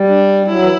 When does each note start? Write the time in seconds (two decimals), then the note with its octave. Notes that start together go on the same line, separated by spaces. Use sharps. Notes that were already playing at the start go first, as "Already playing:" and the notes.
Already playing: G3
0.08 D4
0.48 F#3 E4
0.62 E3